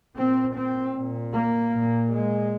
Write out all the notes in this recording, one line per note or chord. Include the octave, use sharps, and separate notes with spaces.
A#2 C4
C4
A#2
A#3
A#2
G#3